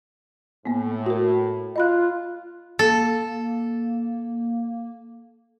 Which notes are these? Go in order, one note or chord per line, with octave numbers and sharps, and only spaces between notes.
A2 A#3 B3
F#4 A#4
F4 D#5 B5 F#6
A#3 A4